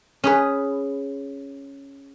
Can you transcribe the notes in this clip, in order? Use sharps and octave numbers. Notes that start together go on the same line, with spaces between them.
C#4 G#4 B4